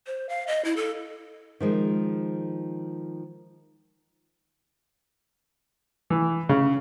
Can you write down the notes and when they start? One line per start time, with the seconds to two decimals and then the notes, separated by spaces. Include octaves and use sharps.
0.07 C5
0.29 F5
0.47 D#5
0.65 E4
0.76 A4
1.60 D#3 F3 G#3
6.10 E3
6.49 C#3